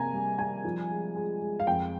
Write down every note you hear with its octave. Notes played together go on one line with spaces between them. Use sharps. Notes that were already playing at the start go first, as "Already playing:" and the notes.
Already playing: C3 A#3 G#5 A#5
G3
G3 G#5
F3
G#3
G#3
G#3
F5
F2 G5